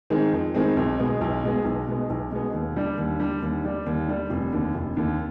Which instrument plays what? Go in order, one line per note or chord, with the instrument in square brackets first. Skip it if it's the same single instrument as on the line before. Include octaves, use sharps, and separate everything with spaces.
[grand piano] D#3 G#3 C4
F2
D#3 G#3 C4
B1
B2 G#3 B3
B1
B2 G#3 B3
B1
B2 G#3 B3
B1
B2 G#3 B3
D#2
D3 G3 D4
D#2
D3 G3 D4
D#2
D3 G3 D4
D#2
D3 G3 D4
F1
D#2 D3
F1
D#2 D3